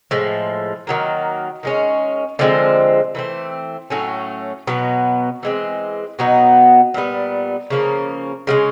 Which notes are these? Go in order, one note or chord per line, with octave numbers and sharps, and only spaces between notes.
A2 F3 G#3
D#3 F#3 A#3
D#3 G#3 C#4
D3 F3 G#3 C4
E3 A3 C4
A2 F#3 A3 C#4
B2 F#3 B3
E3 G#3 C4
B2 F#3 B3 D#4
A#2 G3 B3
C#3 F3 A#3 C#4
C#3 F3 G#3 C#4